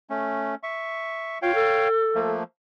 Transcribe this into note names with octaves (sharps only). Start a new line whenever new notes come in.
A3 C#4
E5 C#6
F4 C#5 F5 G5
A4
F3 A3 A#3